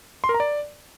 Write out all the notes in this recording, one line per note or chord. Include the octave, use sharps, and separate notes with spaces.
C6
A#4
A#5
D5